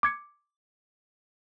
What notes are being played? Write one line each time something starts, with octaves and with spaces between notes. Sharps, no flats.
D6 G#6 C#7